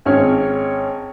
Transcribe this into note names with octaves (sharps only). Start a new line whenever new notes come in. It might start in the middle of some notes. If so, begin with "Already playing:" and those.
G#1 C#4 C#5 F6